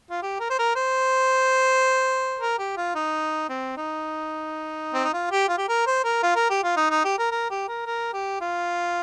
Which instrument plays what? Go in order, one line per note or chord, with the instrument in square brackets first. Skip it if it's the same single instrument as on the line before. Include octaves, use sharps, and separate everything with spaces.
[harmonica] F4
G4
A#4
C5
A#4
C5
A#4
G4
F4
D#4
C4
D#4
C4
D#4
F4
G4
F4
G4
A#4
C5
A#4
F4
A#4
G4
F4
D#4
D#4
G4
A#4
A#4
G4
A#4
A#4
G4
F4